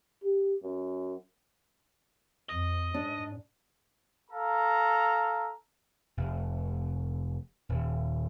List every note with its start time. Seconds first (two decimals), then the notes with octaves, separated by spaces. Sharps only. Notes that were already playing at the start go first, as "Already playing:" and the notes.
0.24 G4
0.62 F#2
2.49 F2 D#5
2.94 G#2 D4
4.30 A4 F5 A#5
6.17 F1
7.69 D#1